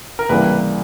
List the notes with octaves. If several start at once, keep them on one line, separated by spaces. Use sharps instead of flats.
A#4
C#2 C3 E3 G3 A#3 B4